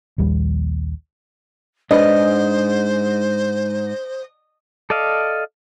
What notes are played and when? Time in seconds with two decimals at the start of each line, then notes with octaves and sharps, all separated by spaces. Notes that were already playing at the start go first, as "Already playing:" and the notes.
0.18 A#1 D#2 G3
1.91 G#2 D4 B4 C5 D#5
4.90 A4 D5 D#5 F5